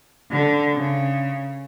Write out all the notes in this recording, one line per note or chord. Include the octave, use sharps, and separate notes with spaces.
D3
C#3